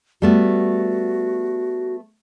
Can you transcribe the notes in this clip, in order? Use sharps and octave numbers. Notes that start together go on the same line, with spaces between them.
G3 A3 B3 F#4